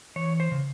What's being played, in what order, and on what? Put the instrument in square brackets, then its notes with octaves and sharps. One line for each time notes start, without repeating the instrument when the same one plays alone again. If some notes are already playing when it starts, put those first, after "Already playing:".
[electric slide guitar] E3 C#5
C5
C#3